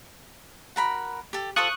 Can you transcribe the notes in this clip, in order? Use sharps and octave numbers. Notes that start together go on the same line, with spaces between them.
F#4 A#4 B5
G4 A4
F4 A4 C5 C#6 D#6 F#6